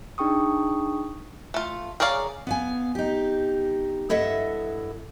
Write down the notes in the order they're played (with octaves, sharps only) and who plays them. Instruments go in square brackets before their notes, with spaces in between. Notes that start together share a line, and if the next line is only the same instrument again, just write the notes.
[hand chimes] D4 D#4 G#4 G5 C#6 D#6
[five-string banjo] A3 F4
G#4 A#4 C#5 D5 F5
[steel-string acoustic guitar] B3 F5 G#5
D#4 G4
G2 E4 A4 D#5 E5 F#5